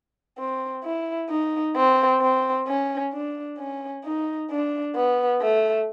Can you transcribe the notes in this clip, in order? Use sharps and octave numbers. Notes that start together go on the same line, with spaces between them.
C4
E4
D#4
C4
C4
C#4
D4
C#4
D#4
D4
B3
A3